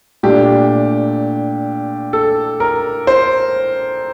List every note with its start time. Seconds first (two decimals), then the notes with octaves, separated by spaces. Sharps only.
0.23 A#2 A3 D4 G4
2.13 A4
2.60 A#4
3.07 C5